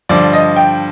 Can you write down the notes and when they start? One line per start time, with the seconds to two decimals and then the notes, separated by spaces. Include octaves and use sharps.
0.09 G2 D3 F3 D5
0.33 D#5
0.57 G5